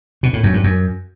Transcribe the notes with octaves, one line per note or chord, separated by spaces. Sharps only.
B2
A2
F#2
G2
F#2